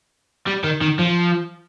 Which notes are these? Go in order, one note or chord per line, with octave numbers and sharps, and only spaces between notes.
G3
D#3
D#3
F3